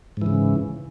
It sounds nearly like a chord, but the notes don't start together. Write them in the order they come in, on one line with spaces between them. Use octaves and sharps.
G#2 E3 C#3